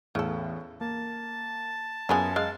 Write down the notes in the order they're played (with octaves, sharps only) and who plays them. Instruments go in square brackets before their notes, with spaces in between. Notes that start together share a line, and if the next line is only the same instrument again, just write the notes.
[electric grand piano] E2 A2 [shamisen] C#3 A4
[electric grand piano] A#3 [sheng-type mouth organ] A5
[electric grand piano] F#2 [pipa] A#3 G#5 [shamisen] B3 F4 G#4
[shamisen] G#3 [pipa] F5